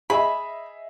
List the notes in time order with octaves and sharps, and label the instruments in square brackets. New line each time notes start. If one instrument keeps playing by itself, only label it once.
[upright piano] G#4 D#5 E5 [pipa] B5